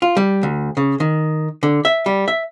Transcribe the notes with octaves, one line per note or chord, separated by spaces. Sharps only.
F4
G3
D2
C#3
D#3
D3
E5
G3
E5